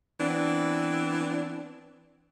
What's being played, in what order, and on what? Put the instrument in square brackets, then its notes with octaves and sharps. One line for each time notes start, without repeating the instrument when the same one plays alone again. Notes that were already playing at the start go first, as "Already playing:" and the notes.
[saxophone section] E3 B3 C4 D4